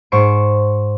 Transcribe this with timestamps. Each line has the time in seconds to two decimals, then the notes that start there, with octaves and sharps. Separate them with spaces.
0.12 G#2 C5 C#6 D7